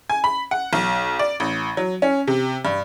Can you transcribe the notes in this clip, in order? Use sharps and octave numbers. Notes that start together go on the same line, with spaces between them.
G#5
B5
F#5
B1
D5
A1
F#3
C#4
C3
G2